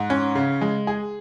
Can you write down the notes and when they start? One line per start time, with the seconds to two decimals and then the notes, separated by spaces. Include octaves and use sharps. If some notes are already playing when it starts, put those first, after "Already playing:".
Already playing: G#2
0.10 C#4
0.35 C#3
0.61 G#3
0.87 G#4